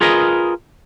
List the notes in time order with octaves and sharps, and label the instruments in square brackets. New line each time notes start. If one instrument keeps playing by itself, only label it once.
[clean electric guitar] F4 G#4 A#4 B4 D#5